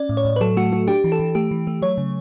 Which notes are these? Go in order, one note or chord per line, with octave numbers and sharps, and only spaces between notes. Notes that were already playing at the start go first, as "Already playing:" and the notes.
Already playing: C#4 D5
A2
C#5
A2
B4
F#3 A4
A3 F#4
A3 F#4
D4 G4
E3
A4
E3
A3 G4
E3
A3
F#3 C#5
C#3